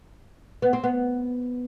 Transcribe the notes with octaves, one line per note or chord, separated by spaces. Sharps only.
B3
C4
B3